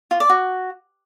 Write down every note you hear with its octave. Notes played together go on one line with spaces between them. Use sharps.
F4
D5
F#4